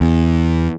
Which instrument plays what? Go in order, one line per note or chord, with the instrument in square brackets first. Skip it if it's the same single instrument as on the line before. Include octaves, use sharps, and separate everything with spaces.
[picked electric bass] E2